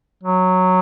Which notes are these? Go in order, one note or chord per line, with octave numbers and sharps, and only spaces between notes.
F#3